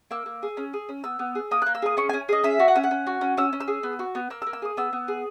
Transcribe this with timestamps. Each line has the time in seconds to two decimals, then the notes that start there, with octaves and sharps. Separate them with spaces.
0.11 A#3 E6
0.26 A#3
0.43 G#4
0.57 C#4
0.73 G#4
0.89 C#4
1.04 B3 E6
1.19 B3
1.35 G#4
1.51 A#3 D#6
1.62 A#3 F#6
1.75 E6
1.82 G#4 D#6
1.97 C#4 C#6
2.09 C#4 G#5
2.29 G#4 D#5
2.43 C#4 E5
2.59 F#4
2.68 F#5
2.75 C#4 E5
2.84 F#5
2.91 C#4
3.07 F#4
3.21 C#4
3.37 C#4 E6
3.53 C#4
3.60 E6
3.68 G#4
3.83 B3
3.99 F#4
4.15 B3
4.30 A#3 E6
4.42 E6
4.47 A#3
4.53 E6
4.62 G#4 D#6
4.77 B3 E6
4.93 B3
5.08 G#4